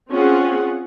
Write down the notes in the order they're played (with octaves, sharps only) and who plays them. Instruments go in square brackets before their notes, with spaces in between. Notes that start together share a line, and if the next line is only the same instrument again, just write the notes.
[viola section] C4 C#4 F4 G#4 F#5